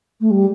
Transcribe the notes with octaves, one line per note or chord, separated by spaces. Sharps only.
A3
G3